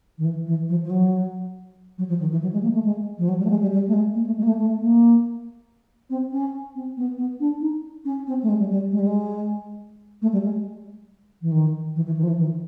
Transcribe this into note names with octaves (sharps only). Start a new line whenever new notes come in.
D#3
E3
E3
F3
F3
F#3
F#3
F3
D#3
E3
F#3
G#3
A#3
A3
G#3
F3
F#3
G3
A3
G#3
G3
G3
A3
G#3
A#3
A3
G#3
A#3
A3
A3
A#3
C4
C#4
C4
B3
B3
D4
D#4
C#4
C4
A3
G#3
G3
G3
G#3
G3
G#3
A3
G3
G#3
E3
D#3
E3
E3
D#3
F3
E3
D#3